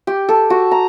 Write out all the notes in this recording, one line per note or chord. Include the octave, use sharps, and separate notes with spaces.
G4
A4
F#4
A#5